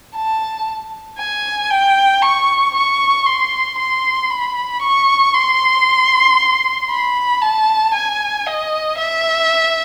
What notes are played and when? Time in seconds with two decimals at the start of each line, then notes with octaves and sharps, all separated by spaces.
0.15 A5
1.18 G#5
1.70 G5
2.22 C#6
2.74 C#6
3.26 C6
3.78 C6
4.30 B5
4.82 C#6
5.34 C6
6.90 B5
7.42 A5
7.94 G#5
8.46 D#5
8.98 E5